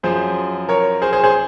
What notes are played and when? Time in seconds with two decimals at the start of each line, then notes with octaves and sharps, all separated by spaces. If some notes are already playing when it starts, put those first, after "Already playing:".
0.03 F#2 F3 G#4 C5
0.69 A#4 C#5
1.02 G#4 C5
1.13 G#4 C5
1.24 G#4 C5